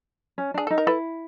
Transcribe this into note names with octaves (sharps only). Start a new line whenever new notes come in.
C#4
D4 G#4
D#4 A4
A#4
E4 A4 B4